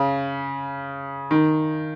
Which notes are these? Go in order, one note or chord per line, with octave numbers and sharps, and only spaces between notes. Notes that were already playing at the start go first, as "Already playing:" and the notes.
Already playing: C#3
D#3